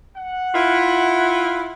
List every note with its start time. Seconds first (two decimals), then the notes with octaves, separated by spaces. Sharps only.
0.16 F#5
0.55 E4 F4